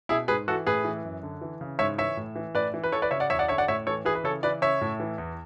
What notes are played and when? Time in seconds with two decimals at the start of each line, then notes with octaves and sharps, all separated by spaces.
0.09 B2 E4 G#4
0.28 G#2 G#4 B4
0.48 E3 F#4 A4
0.67 A2 G#4 B4
0.85 E3
1.04 F#2
1.23 D3
1.41 E3
1.61 C#3
1.79 G#2 C#5 E5
1.98 E3 C#5 E5
2.17 A2
2.36 E3
2.55 A2 B4 D5
2.74 E3
2.83 B4
2.92 E3 A4 C#5
3.02 B4 D5
3.11 C#3 C#5 E5
3.20 D5 F#5
3.30 E2 C#5 E5
3.39 D5 F#5
3.48 D3 C#5 E5
3.58 D5 F#5
3.68 A2 C#5 E5
3.86 E3 A4 C#5
4.05 E3 G#4 B4
4.15 B4
4.24 C#3 A4 C#5
4.43 E3 B4 D5
4.61 C#3 C#5 E5
4.81 A2
5.00 E3
5.18 E2